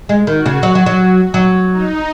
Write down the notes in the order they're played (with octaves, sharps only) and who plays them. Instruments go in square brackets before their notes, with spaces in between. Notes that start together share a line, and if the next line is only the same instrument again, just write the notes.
[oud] G#3
[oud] D#3 [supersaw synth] F#4
[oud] C#3
F#3
F#3
F#3
F#3
[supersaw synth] D#4